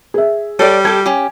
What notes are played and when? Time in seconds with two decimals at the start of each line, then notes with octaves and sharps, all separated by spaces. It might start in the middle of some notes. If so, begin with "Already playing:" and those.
0.14 G#4 E5
0.59 G3 A4 C#5 D5
0.85 G4 A4 G#6
1.06 C#4 G4